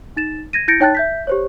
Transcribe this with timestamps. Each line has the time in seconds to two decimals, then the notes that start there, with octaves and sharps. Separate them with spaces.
0.16 D#4 A6 E7
0.53 G#6 A#6 D#7
0.68 E4 G6 A6 A#6 C#7 D7
0.80 D#4 C#5 G5 A5 F#6 A6
0.95 E5 G6 B6
1.27 G4 C5 C#5